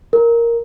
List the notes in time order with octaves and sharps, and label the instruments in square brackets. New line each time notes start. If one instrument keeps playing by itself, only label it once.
[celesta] A#4